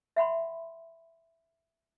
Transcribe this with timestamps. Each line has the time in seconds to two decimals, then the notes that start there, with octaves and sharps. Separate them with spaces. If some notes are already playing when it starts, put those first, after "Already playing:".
0.16 E5 F#5 B5 C6